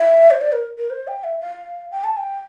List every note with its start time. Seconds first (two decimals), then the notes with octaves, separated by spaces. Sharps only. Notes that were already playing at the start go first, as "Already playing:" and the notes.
Already playing: E5
0.31 C5
0.41 D5
0.52 A#4
0.78 A#4
0.90 C5
1.07 G5
1.24 E5
1.41 F5
1.91 G5
2.04 A5
2.17 G5